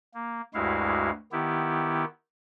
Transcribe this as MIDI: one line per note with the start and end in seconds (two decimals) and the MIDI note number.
0.14 0.41 58
0.54 1.10 38
0.54 1.10 43
0.54 1.10 56
0.54 1.10 64
0.54 1.10 66
0.54 1.10 77
1.32 2.05 51
1.32 2.05 59
1.32 2.05 64
1.32 2.05 67